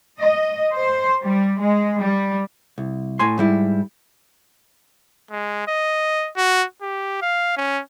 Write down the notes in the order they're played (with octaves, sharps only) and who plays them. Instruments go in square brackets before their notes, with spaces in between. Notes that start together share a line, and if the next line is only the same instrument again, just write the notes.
[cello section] D#5
C5
G3
G#3
G3
[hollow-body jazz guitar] C2
A2 G#5 C6
G#2 G3 E4
[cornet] G#3
D#5
F#4
G4
F5
C#4